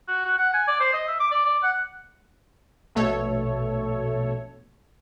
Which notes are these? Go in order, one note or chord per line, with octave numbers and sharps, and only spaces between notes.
F#4
F#4
F#5
G#5
D5
C5
D#5
E5
D6
D5
D5
F#5
A#1 B2 A3 A4 C#5